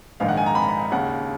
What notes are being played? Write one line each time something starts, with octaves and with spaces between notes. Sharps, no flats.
A#1 G#2 D#3 F5
F#5
G#5
A#5
B5
A#5
B5
D#2 C#3 F#5